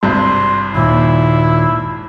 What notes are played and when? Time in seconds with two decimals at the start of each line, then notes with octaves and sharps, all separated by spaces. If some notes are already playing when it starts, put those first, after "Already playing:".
0.03 G#1 G2 C3 C6
0.74 D#2 A#2 E4